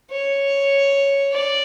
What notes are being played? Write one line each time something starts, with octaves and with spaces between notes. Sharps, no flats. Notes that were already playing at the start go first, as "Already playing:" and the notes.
C#5
D5